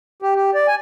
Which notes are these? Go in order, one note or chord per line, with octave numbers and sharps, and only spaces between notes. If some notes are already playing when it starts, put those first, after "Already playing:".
G4
G4
D5
G#5